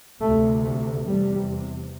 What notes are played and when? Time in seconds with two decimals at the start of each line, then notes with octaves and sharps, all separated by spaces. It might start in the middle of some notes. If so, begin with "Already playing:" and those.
0.21 D2 C3 A3
0.64 A3
1.06 E2 C3 G3